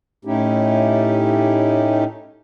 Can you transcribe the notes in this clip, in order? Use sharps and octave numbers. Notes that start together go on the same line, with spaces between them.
A2 A3 C#4 D#4 E4 G4